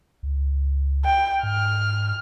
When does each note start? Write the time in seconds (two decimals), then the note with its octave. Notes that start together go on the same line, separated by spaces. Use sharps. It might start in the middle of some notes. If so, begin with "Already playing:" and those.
0.23 C#2
1.05 G5
1.43 G#2 F6